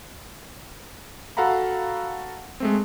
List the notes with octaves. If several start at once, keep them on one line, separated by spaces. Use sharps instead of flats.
F#4 A4 F5 F#5 A#5 B5
G#3 A3 C4